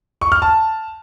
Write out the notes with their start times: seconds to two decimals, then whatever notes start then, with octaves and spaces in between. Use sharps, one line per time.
0.21 C#6
0.32 F6
0.42 A5